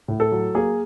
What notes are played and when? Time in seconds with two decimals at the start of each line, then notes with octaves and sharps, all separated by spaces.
0.08 A2
0.20 A4
0.32 F#3
0.55 A#3 G#4